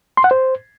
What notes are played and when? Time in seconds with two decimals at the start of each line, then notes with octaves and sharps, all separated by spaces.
0.17 C6
0.24 F#5
0.31 C5